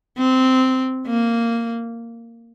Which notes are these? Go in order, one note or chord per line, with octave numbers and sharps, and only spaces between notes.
C4
A#3